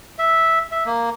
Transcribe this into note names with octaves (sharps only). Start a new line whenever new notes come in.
E5
E5
A#3